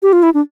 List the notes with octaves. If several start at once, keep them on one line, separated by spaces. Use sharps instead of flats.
G4
F4
E4
D4